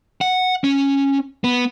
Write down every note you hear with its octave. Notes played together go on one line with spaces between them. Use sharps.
F#5
C#4
B3